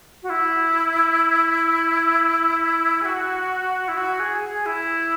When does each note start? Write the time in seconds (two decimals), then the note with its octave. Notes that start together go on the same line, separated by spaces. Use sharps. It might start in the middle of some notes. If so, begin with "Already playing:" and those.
0.23 F#4
0.30 E4
3.02 G#4
3.05 F#4
3.88 E4
3.97 F#4
4.20 G#4
4.43 G#4
4.66 E4